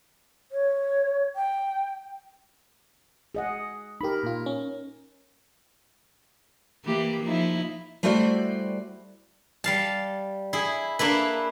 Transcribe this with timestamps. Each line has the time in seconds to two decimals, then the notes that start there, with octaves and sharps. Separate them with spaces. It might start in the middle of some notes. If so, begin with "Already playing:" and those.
0.52 C#5
1.36 G5
3.35 G#4 D#5 F#5
4.01 D#4 G4 A#4 B5
4.23 A#2 F4
4.46 C#4
6.85 E3 A#3 G4
7.24 F3 D#4 E4
8.03 G3 A3 E4 F#4 C5 D5
9.64 G3 F5 A5
10.53 E4 G#4
10.99 A#3 D4 E4 B4